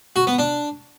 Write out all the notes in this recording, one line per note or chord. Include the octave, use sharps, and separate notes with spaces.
F#4
B3
D4